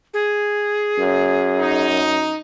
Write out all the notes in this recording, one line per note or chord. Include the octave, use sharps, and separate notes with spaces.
G#4
F#2
D#4